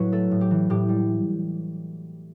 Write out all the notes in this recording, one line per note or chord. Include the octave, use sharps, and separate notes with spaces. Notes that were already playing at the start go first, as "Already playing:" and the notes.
Already playing: A2 F#3 F#4 B4
A3 A4
A2
G4
E3
A2 G4
G3